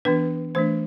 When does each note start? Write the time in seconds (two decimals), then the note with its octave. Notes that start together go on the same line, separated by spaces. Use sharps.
0.05 E3 B3 D4 B4
0.55 E3 A3 D4 C5